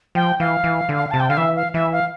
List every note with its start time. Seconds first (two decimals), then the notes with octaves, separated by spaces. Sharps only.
0.15 F3 G5
0.40 E3 F5
0.64 E3
0.89 D3
1.11 C3 A5
1.20 G5
1.29 D3 F5
1.37 E3 E5
1.56 F5
1.74 E3 E5
1.92 F5